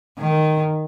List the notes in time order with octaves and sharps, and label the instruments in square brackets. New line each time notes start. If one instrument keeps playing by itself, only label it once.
[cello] D#3